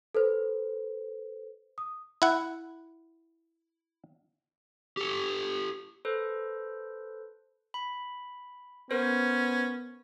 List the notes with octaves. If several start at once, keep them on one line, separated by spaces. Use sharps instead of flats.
A4 B4 C5
D#6
E4 F#5
G4 A4
A4 B4 C5
B5
B3 C#4 A#4 C5